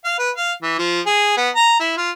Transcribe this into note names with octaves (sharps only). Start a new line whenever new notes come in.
F5
B4
F5
E3
F3
G#4
B3
A#5
E4
F4